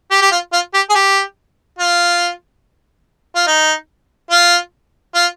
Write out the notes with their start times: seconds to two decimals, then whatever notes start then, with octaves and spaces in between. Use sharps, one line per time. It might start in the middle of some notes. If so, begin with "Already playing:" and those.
0.11 G4
0.22 G4
0.32 F4
0.53 F4
0.74 G4
0.90 G#4
0.95 G4
1.79 F4
3.35 F4
3.47 D#4
4.31 F4
5.14 F4